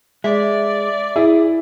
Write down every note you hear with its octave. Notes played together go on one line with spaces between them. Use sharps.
G#3 D5 E5
E4 G#4